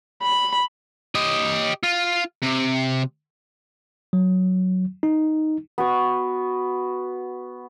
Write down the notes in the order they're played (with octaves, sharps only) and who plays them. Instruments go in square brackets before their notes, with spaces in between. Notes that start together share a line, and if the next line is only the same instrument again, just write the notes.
[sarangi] B5
[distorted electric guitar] G4 D#5
F4
C3
[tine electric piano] F#3
D#4
[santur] B3 F#4 C#6